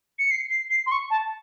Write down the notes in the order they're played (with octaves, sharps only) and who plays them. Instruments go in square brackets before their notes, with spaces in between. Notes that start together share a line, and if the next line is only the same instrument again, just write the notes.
[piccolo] C#7
C7
C7
C7
C6
C#6
A5